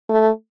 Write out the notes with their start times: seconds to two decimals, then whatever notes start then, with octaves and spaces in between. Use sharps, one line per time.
0.09 A3